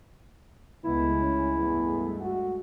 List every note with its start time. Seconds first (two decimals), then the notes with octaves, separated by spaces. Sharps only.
0.84 C#2 G#3 A3 B3 E4
1.21 C#4
1.56 E2 G2 G#3 A3
2.20 F#4